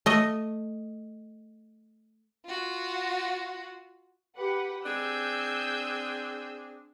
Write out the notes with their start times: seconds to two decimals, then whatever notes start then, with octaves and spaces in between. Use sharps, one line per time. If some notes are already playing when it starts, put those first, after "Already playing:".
0.06 A3 D#5
2.46 F4 F#4
4.37 G4 B4 F#5
4.85 C4 D4 G#4 E6 G6